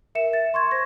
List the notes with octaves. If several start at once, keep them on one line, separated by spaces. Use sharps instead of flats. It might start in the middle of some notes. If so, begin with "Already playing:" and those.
A#4 E5 C#7 E7
A6
C6 C#6 G#6
C5 A#6